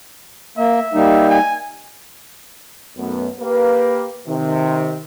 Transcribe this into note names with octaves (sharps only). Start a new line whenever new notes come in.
A#3 E5
G3 A#3 D#4
G#5
B1 F#2 A3 B3
A#3 G4 B4
C3 D#3